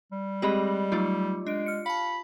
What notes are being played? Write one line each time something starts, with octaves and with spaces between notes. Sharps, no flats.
G3
G#3 C4 G4 G#4 D#5 B5
F#3 A3 D#4 F4 D5
G#3 D4 D7
F6 C#7
F5 A5 B5